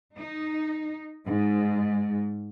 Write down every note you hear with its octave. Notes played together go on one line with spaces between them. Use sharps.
D#4
G#2